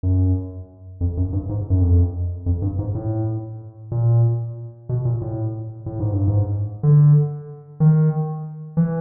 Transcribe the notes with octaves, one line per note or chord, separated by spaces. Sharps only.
F#2
F2
F#2
G2
G#2
F#2
F2
F2
G2
G#2
A2
A#2
B2
A#2
A2
A2
G#2
G2
G#2
D3
D#3
E3